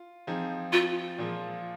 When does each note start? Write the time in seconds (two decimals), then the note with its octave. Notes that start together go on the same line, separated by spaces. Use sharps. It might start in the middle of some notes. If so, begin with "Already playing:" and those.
Already playing: F4
0.27 F3 C4 D#4 G#4
0.73 F4
1.18 A#2 F3 G#3